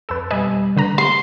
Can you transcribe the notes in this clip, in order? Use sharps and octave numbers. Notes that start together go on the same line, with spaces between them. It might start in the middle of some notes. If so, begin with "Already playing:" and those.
F2 A4 B4 A5 E6
B2 G3 B4 D#5 G#5
D3 B4 A#5
C6